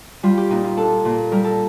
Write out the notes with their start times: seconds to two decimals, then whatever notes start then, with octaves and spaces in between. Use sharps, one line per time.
0.23 G3 F4
0.37 G4
0.50 A#2 D#4
0.64 F4
0.77 D4 A4
1.05 A#2
1.32 G3 A#4
1.44 A4